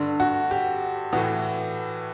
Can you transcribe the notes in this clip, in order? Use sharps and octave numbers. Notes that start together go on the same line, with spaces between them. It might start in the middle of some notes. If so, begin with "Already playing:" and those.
Already playing: G2 D3
F#4
G4
A2 E3 F#4